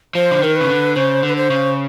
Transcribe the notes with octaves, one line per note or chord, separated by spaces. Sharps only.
F3 C5
D3
D#3 A#4
C#3 B4
D3
C#3 C5
D3
B4
C5
C#3